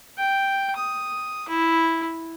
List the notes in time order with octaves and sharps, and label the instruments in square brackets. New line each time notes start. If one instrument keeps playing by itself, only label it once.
[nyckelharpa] G5
D#6
E4